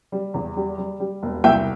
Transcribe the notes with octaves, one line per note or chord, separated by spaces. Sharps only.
G3
E2
G3
G3
G3
E1
C2 E5 G5